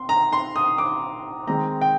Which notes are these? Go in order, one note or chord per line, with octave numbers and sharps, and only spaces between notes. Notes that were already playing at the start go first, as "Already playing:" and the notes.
Already playing: C4 C6
A#5
C6
D#6
D6
D#3 G#3 C4 A#5
G5